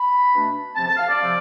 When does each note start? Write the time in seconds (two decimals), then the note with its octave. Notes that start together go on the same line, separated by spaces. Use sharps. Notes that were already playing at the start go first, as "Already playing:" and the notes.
Already playing: B5
0.32 B2 A3 D4
0.76 C3 F3 C4 A5
0.87 A5
0.97 F5
1.08 D5
1.19 C3 F3 C4